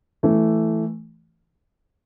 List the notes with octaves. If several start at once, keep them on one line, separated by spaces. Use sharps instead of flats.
E3 A3